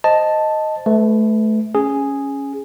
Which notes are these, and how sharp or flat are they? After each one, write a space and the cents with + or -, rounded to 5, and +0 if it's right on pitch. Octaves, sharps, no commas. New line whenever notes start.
C5 +0 D#5 +0 A5 +0
A3 -20 B4 +15
C#4 +0 G#4 +0